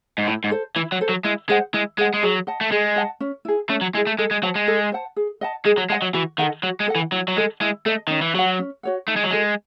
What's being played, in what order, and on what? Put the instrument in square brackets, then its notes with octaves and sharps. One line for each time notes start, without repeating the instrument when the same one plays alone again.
[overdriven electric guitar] G#2
[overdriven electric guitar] A2 [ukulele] E4
[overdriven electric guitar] G#2
[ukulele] A4 C5
[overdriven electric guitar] E3 [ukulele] E4
[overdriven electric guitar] F#3
[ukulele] A4 C5
[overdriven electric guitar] F#3
[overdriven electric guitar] G#3 [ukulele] E4
[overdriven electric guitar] G#3 [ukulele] G#4 C5 F#5
[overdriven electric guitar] G#3 [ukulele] E4
[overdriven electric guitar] G#3 [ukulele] G#4 C5 F#5
[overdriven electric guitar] G#3
[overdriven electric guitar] F#3 [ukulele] G#4
[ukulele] D#5 F#5 A5
[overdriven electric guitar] A3
[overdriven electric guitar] G#3 [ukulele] G#4
[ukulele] D#5 F#5 A5
C#4
E4 G#4
[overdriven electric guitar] A3 [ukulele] C#4
[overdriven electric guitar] F#3
[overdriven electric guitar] G#3 [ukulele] E4 G#4
[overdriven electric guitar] A3
[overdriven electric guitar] G#3 [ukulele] A4
[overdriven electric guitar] G#3
[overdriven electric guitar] F#3 [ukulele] C5 F#5 A5
[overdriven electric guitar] G#3
[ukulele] A4
C5 F#5 A5
G#4
D#5 F#5 A5
[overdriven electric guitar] G#3 [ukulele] G#4
[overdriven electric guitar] F#3
[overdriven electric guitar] G#3 [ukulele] D#5 F#5 A5
[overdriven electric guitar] F#3
[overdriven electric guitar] E3 [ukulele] F#4
[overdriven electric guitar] D#3 [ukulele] A4 D#5 F#5
[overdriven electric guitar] F#3 [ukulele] F#4
[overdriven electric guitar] G#3
[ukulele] A4 D#5 F#5
[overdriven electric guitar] E3
[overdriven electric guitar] F#3 [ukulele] E4
[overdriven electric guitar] F#3
[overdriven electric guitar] G#3 [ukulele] A4 D#5
[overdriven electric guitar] G#3 [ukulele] E4
[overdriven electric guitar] A3 [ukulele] A4 D#5
[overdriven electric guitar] D#3 [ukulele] C#4
[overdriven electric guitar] E3
[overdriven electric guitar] F#3 [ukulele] F#4 C#5 F#5
[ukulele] C#4
F#4 C#5 F#5
[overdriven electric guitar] A3 [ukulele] D#4
[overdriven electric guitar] G#3
F#3
[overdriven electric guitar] G#3 [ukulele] F#4 A4